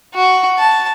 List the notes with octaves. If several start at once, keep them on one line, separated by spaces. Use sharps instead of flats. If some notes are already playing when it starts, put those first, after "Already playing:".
F#4
A5